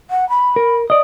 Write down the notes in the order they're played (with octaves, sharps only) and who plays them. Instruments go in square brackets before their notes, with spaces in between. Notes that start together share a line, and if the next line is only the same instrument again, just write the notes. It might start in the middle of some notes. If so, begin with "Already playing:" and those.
[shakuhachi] F#5
B5
[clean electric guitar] A#4
D5 D#5